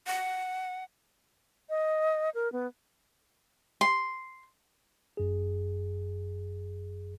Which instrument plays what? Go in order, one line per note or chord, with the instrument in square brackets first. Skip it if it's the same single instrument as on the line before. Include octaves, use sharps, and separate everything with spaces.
[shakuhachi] F#5
[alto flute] D#5
A#4
B3
[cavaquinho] C6
[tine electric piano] G1 F#2 G#4